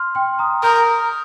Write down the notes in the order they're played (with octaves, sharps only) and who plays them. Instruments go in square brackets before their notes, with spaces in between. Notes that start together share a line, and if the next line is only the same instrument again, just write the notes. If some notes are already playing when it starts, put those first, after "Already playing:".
Already playing: [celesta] C6 F6
G5 C6
A#5 D#6
[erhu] A#4 [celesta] D#6 G6